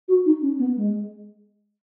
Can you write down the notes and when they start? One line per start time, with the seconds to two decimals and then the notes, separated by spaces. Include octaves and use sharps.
0.08 F#4
0.26 D#4
0.42 C#4
0.59 B3
0.77 G#3